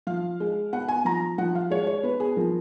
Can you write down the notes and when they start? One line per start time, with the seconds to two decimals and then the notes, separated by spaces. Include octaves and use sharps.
0.07 F3 F5
0.40 G#3
0.73 B3 F#5
0.88 G#5
1.05 F3 A#5
1.38 F3 F#5
1.55 F5
1.70 G#3 C#5
1.87 C#5
2.03 B3 B4
2.20 G#4
2.36 F3 A#4